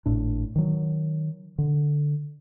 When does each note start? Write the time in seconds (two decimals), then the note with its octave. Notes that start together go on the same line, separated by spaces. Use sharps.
0.06 G#1 A2 D4
0.56 D#3 F#3
1.58 D3